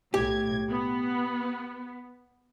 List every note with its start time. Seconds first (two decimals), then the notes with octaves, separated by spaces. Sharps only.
0.14 B1 A2 G4 G#6
0.69 B3